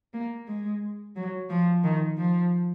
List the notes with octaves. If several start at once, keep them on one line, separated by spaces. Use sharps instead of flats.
A#3
G#3
F#3
F3
D#3
F3